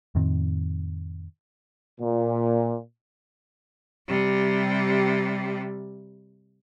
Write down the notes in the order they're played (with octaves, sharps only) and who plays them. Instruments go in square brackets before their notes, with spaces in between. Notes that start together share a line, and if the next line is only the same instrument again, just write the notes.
[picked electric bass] F2 A2 D#3 C4
[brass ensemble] A#2
[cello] C3 G3